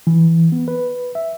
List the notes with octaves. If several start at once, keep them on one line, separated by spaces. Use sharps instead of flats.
E3
B3
B4
E5